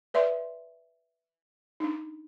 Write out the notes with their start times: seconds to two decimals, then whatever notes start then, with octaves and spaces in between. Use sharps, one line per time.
0.14 B4 D5 E5 C6
1.80 D4 D#4